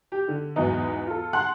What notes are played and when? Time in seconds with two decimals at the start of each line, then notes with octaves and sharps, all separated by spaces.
0.12 G4
0.28 D3
0.56 E2 G#2 E3 F#3 B3 D#4
1.07 F4 A4
1.33 F#5 A5 C6 F#6